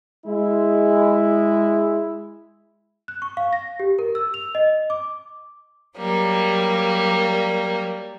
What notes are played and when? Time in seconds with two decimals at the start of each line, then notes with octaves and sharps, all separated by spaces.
0.26 G#3 E4
3.08 F#6
3.22 C#6
3.37 F5
3.53 A#6
3.80 G4
3.99 A#4
4.15 E6
4.34 F7
4.55 D#5
4.90 D6
5.96 F#3 G3 A#3